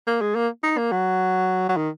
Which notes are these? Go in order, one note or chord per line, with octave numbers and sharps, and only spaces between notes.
A#3
G#3
A#3
D#4
A#3
F#3
F#3
D#3